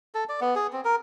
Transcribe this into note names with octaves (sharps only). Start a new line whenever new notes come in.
A4
D5
B3
G#4
C4
A#4